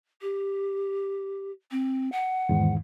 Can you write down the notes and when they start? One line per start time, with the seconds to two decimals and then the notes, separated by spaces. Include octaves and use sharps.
0.21 G4
1.71 C4
2.12 F#5
2.49 E2 G#2 D#3